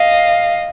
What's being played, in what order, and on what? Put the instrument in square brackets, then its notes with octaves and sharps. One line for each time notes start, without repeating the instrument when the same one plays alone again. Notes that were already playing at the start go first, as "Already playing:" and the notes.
Already playing: [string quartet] D#5 F5